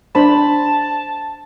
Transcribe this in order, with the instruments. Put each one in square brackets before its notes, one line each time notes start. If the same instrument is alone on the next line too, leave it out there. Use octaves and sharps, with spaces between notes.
[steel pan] D4 C5 B5 [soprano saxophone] A5